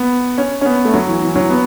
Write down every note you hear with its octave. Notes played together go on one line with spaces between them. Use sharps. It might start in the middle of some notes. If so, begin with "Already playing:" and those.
Already playing: B3
C#4
C#4
B3
A3
F#3
E3
E3
F#3
B3